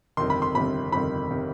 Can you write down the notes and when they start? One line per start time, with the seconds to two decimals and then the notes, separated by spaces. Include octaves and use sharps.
0.17 G1 F2 C3 D#3 C6
0.30 B5
0.42 C6
0.55 G1 F2 C3 D#3 B5
0.92 G1 F2 C3 D#3 B5
1.31 C3 D#3